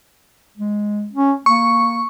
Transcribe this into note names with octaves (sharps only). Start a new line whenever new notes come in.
G#3
C#4
A#3 C#6